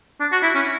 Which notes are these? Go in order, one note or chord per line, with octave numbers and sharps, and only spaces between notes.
D4
F#4
E4
C#4